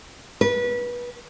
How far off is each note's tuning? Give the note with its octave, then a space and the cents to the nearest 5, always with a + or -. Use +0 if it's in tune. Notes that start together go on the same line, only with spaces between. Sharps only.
B4 -25